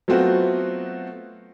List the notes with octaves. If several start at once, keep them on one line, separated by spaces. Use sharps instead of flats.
F#3 A3 B3 C4 F4 F#4